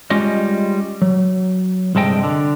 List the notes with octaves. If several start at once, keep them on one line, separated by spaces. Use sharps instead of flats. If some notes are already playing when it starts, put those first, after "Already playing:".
G3 G#3 C#4 F4 D#5
F#3
C2 G2 G#3 A4 D#5 G5
D3